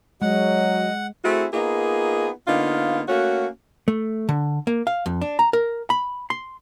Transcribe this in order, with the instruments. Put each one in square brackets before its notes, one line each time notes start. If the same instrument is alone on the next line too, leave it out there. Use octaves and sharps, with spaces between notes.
[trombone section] F#3 [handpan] G#3 [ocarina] D#5 [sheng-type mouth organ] F#5
[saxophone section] A3 C4 E4 F#4 G#4
A#3 B3 D#4 F4 G#4
D3 A#3 B3 D#4 F4
A3 A#3 C#4 F#4
[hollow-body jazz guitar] A3
D3
A#3
F5
F2
D4
A#5
A#4
B5
C6